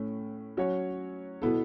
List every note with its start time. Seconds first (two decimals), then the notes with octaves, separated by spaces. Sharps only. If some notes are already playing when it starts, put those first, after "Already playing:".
Already playing: A2 A3 C#4
0.57 F#3 C#4 F#4 C#5
1.42 B2 B3 E4 A4